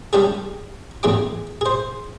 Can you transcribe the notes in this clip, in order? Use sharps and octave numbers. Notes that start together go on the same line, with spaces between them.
G3 C#4 D4 G4 G#4
A1 E2 G#4 G#5 D6
G#4 C5